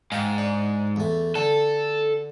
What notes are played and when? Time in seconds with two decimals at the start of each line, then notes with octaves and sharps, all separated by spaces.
0.12 G#2 F5 G5
0.38 D4
0.96 E2 A3
1.35 D3 A4